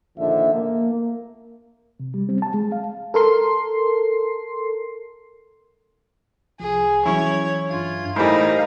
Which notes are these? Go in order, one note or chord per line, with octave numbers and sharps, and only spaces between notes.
A#1 D3 D#3 F3 E5
A#3
C3
G3
C4
A5
G#3
F5
A4 A#4 C6 C7
C2 F3 G#4
E3 F#3 C#4 E4 C#5
G2 F4 G#6
A2 E3 G3 G#3 D#4 A#4 C5 F5